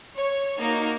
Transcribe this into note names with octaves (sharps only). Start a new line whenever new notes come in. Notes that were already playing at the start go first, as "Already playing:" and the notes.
C#5
A#3 D#4 F#4